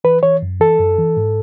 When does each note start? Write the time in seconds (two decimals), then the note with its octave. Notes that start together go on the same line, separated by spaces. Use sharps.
0.04 E3 B4
0.23 E3 C#5
0.42 F#2
0.60 E3 A4
0.79 F#2
0.98 E3
1.17 G#2